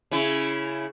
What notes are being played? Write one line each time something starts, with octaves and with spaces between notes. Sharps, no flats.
C#3 E4